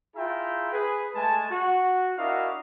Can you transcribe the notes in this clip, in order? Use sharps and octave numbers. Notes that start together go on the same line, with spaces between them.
E4 F4 G#4 E5 G5 A#5
G#4 B4
G#3 A3 G#5 A5
F#4
D4 E4 F#4 A#4 D#5 F5